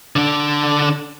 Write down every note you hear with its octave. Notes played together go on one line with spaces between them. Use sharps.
D3 D4